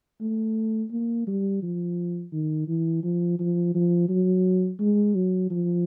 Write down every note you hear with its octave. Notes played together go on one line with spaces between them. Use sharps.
A3
A#3
G3
F3
D#3
E3
F3
F3
F3
F#3
G#3
F#3
F3